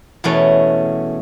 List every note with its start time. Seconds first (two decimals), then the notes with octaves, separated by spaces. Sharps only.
0.24 E2 B2 A3 C#4